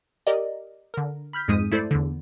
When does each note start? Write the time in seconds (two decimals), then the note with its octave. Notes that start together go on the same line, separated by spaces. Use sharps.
0.27 G4 A#4 D5 D#5
0.94 D3 A#4
1.33 B5 F6 G6 B6
1.48 F2 G#2 G#3 D#6 D#7
1.72 A3 E4 A4 C5 D5
1.91 E2 D3